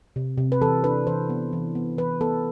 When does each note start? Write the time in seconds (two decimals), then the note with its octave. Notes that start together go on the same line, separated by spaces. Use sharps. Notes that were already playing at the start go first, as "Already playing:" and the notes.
0.16 C3
0.38 C3
0.52 B4
0.61 E3 A4
0.84 D4 B4
1.07 E3 C5
1.29 B3
1.53 E3
1.75 B3
1.98 E3 B4
2.21 B3 A4